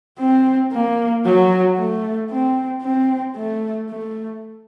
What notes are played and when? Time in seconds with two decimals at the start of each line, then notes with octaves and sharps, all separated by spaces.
0.19 C4
0.72 A#3
1.25 F#3
1.78 A3
2.30 C4
2.82 C4
3.36 A3
3.89 A3